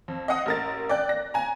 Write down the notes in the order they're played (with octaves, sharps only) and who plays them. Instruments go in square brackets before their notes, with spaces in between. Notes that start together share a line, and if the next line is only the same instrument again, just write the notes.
[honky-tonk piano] F2
D#5 F5 F#5 D#6
A1 A#4 A6
D5 G5 F#6
A#6
G#5 A#5